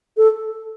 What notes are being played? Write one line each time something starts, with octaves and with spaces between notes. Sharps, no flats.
A4